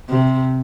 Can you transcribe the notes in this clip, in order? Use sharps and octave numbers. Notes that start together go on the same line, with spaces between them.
C3